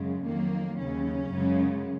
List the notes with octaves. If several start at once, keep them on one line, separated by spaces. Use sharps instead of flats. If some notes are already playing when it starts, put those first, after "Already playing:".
Already playing: F#2 C#3 G#3
F2 D#3 F#3 A#3
D#2 C#3 F#3 C#4
F#2 C#3 G#3